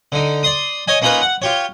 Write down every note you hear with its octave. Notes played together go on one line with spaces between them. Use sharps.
D3 D#4
D5 C6 D#6
C#5 D#5 G#5
A#3 C#4 D#4 F4 A#4 B4
F#5
F4 G4 C#5